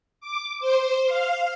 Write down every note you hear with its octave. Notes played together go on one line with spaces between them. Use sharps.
D6
C5
F5